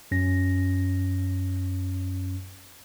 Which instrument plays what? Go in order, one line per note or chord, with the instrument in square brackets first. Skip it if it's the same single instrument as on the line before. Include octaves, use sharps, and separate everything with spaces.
[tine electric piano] F#2 C#4 A#6